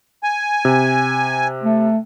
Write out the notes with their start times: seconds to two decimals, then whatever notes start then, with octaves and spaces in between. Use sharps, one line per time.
0.23 G#5
0.65 C3
1.64 A3